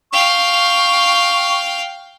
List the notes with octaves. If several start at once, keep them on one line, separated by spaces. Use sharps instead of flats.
F5 G5 C#6